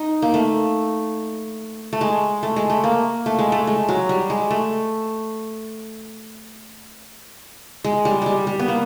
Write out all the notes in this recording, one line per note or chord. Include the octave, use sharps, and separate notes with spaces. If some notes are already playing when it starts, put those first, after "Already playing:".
Already playing: D#4
A#3
A3
A3
G#3
A3
G#3
A3
A#3
A3
G#3
A3
G#3
F#3
G3
G#3
A3
G#3
G3
G3 G#3
G3
B3
A#3